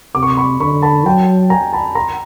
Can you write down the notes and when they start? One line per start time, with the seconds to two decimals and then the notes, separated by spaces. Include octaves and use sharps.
0.15 C3 D6
0.23 C#6
0.30 C6 D6
0.37 B5 C#6
0.60 D3 B5 C#6
0.82 A5 B5
1.06 F#3 G5 A5
1.50 G#5 A#5
1.73 A5 B5
1.95 A#5 C6